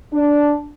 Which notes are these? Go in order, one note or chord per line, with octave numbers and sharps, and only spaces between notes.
D4